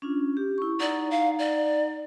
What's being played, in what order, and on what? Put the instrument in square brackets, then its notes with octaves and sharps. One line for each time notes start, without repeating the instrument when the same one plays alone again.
[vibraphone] C#4 D4 F4
G4
E4 C#6
[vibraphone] D#4 F#5 A#5 [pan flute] D5
[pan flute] F5
D5